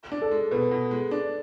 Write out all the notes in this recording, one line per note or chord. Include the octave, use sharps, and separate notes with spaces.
D4
A4
G#3
B2 B4
B2
G#3
D4